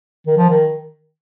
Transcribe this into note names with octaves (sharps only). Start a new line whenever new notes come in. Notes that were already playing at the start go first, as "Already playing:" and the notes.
D#3
F3
D#3